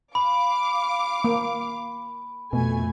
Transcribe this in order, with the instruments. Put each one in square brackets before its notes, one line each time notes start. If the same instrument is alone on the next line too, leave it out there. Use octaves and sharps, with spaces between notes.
[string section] F5 D6 [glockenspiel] B5
[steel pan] A#3
[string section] F2 A3 G#5 [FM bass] B2